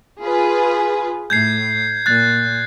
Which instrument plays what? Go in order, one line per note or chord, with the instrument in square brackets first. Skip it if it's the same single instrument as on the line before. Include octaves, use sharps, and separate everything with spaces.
[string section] F4 G#4 B4
[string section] A2 [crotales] G6 G#6 C7
[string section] A#2 [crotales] F#6 A6